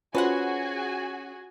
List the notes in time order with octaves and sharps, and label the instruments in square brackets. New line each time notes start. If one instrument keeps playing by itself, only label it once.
[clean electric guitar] C#4 [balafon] F4 [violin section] F#4 G#4 G#5 [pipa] B4 C5 F#5